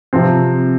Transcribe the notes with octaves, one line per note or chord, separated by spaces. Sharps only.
C3 F3 C4